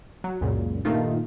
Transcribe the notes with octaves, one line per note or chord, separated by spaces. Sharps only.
F#3
C#2 F#2 A#2 C#3
G2 A#2 D#3 A3 D#4 F4